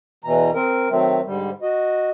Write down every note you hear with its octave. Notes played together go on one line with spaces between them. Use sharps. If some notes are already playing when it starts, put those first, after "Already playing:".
E2 B2 E3 A#5
C4 A#4
D#3 F#3 A3 C4
G#2 D3 G3
F#4 D#5